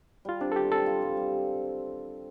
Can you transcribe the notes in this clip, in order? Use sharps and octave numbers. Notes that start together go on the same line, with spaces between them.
G3 F4
C4 D4
A4
G3 G4
C4 A4
F4
G3
G3